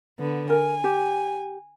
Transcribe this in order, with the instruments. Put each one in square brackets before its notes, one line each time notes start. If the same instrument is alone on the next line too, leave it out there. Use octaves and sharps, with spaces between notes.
[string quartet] D3 B3
[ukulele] A#4 [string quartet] G#5
[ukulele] G4